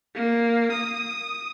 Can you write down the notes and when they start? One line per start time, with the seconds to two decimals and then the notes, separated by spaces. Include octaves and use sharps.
0.15 A#3
0.72 D#6